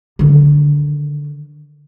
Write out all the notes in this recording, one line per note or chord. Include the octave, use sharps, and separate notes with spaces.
D3 D#3